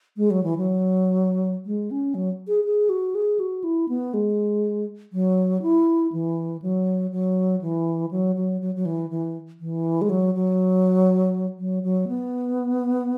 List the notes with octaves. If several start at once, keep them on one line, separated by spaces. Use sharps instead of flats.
G#3
F#3
E3
F#3
G#3
C#4
F#3
G#4
G#4
F#4
G#4
F#4
E4
B3
G#3
F#3
E4
E3
F#3
F#3
E3
F#3
F#3
F#3
F#3
E3
E3
E3
G#3
F#3
F#3
F#3
F#3
B3